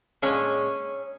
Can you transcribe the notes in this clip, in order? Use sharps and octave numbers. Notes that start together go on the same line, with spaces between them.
A#2 G#3 C#4